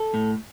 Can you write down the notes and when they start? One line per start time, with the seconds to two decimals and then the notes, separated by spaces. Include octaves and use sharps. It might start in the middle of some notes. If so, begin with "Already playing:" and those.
Already playing: A4
0.14 A2